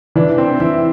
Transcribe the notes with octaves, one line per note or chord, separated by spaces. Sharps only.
E3 D4
C4
E3 E4